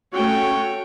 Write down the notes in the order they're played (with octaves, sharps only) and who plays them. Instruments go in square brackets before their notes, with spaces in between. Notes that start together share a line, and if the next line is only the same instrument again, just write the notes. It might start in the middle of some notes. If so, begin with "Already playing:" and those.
[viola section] A3 C#4 F#4 [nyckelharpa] C#5 G5